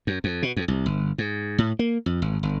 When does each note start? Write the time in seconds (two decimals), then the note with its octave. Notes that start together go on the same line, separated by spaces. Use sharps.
0.07 F#2
0.24 F2
0.43 B2
0.56 F2
0.68 C2
0.86 G1
1.18 G#2
1.58 A2
1.79 A#3
2.06 F2
2.22 G#1
2.43 G1